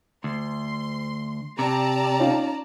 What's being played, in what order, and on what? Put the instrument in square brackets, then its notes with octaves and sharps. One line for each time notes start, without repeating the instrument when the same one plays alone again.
[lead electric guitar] D2 [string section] C6
[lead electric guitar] C3 [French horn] G4 [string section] D5 A5 A#5
[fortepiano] C#4 D#4 F4